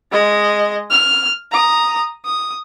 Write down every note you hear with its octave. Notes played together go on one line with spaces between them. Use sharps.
G#3 D#5
F6
A#5 D#6
D#6